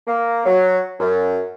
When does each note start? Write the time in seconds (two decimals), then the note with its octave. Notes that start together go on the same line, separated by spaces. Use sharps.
0.08 A#3
0.45 F#3
1.00 F#2